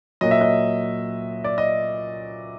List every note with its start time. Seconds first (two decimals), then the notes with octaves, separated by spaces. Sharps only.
0.21 A#2 F#3 D#5
0.31 E5
0.41 D#5
1.44 D5
1.58 D#5